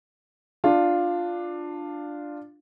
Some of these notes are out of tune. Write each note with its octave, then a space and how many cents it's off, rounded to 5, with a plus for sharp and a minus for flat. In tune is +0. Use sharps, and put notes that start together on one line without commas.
D4 +10 F4 +0